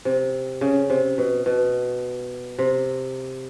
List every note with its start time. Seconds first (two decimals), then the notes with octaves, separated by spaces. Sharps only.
0.05 C3
0.61 C#3
0.90 C3
1.18 B2
1.46 B2
2.59 C3